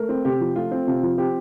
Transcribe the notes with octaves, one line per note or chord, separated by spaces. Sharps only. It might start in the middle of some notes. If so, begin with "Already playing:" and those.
Already playing: A3 A#4
C4
C3 G4
F3
A3 F4
C4
C3 F4
F3
C4 G4